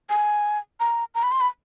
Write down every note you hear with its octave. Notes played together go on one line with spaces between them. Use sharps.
G#5
A#5
A#5
B5
C6
B5